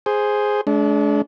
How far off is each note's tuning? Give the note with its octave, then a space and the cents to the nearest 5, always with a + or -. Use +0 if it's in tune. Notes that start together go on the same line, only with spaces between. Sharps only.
G#4 +0 C5 +0
G#3 +40 D4 -25